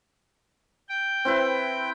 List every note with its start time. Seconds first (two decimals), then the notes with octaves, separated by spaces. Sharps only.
0.89 G5
1.25 C4 E4 B4